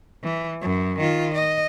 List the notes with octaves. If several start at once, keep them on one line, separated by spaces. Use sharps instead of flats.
E3
F#2
D#3 F4
D#5